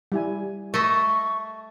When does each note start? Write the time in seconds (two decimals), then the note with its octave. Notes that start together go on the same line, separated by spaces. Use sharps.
0.12 G3 E4 G#5
0.74 A3 A#4 D#5 E5 C#6